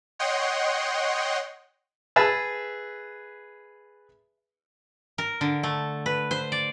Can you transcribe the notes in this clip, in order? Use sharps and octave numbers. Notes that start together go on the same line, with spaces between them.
C#5 D#5 F#5 G5 C6
G#4 B4 E5 A5
A#4
D3
A3
B4
C5
D5